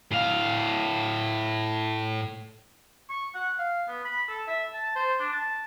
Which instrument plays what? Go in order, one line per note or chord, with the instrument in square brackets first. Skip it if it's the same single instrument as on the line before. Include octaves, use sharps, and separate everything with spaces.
[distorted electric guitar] A2 F5
[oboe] C#6
F#5
F5
B3
B5
A4
E5
A5
C5
D4
A5